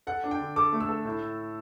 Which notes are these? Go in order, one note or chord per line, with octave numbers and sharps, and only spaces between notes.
A4 F#5
D4
G5
D3
A4 D6
A3
E6
A4
A2